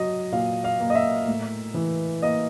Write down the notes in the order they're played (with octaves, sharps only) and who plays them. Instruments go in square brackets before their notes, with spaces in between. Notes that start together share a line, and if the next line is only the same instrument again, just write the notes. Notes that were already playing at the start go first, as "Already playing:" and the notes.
Already playing: [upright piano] F#3 D#5
A#2 F5
F5
A#3
D#5
E5
A2
E3
A#3 D#5